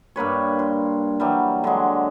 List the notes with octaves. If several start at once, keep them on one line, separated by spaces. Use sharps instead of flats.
G2 A#3 B4 C#5
C6
E3 F#3 G3
D3 F#3 G#3